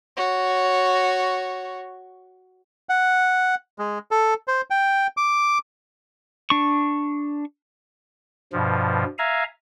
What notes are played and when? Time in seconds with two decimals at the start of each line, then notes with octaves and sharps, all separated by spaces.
0.17 F#4 C#5
2.89 F#5
3.79 G#3
4.11 A4
4.48 C5
4.70 G5
5.17 D6
6.50 D4 C#6
8.53 G2 B2 F3
9.18 E5 F5 G#5 A#5